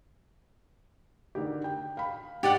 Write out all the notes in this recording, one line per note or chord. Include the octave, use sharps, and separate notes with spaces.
D3 D#3 G4
G5
F5 B5
G#2 G4 D5 F#5